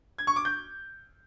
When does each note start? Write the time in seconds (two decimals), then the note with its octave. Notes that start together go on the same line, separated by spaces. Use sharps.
0.18 G#6
0.27 C#6
0.36 D6
0.45 G6